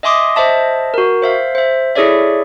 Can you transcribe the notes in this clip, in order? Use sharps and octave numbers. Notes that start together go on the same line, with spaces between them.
D#5 E5 G#5 C6 D6 D#6
C5 D#5 E5 A5
F#4 A#4
C5 E5 F5
C5 E5
E4 G#4 A4 C#5 D5 E5